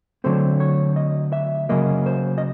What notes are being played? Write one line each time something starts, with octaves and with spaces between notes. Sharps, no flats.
D3 F#3 A3 C4 C5
C#5
D#5
E5
C#3 F#3 A#3 D#5
C5
D#5